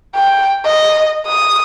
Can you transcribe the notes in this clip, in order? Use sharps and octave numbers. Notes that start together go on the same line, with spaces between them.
G5
D#5
D#6